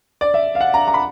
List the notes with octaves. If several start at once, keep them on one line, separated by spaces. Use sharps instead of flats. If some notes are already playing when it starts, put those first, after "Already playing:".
D5
E5
F5
F#5
A#5
A#5
B5